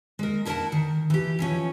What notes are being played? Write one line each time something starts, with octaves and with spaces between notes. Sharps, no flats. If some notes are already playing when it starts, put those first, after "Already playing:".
G#3 A#4
D4 E4 A#4 D#5 F#5 A5
D#3
E3 G4
E3 F3 C#4